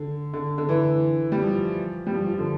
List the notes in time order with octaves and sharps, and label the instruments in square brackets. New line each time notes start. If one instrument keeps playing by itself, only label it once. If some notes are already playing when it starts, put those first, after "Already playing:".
Already playing: [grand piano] D3
D3
D3
E3
G3
F3
G3
F3
F3
D3